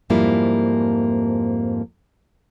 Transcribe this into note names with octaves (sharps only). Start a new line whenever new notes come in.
F2 G#2 F3 G3 A#3 E4